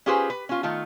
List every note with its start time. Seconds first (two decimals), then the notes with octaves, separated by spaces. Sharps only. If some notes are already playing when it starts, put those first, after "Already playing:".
0.06 C#4 F4 G4 G#4 B4 C5
0.30 B4
0.49 C#4 F4
0.63 D#3 A3 F4